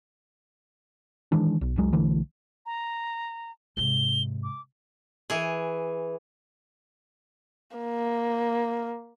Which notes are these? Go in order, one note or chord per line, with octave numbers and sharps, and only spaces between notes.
D#3 E3 G#3 D4
B1
C#2 F#3 G#3
B1 D3 E3 A3
A#5
G#2 C3 G7
D6
E3 G#4
A#3